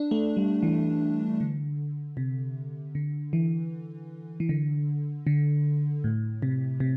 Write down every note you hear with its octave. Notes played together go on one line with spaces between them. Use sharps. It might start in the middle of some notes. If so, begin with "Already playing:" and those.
Already playing: D4
A3
G3
E3
D3
C3
D3
E3
E3
D3
D3
A2
C3
C3